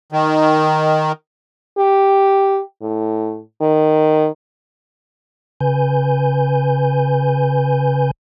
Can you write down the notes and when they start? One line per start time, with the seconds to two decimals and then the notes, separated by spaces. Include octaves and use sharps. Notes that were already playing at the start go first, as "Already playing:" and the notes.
0.12 D#3
1.78 G4
2.82 A2
3.61 D#3
5.61 C#3 B4 G#5 G6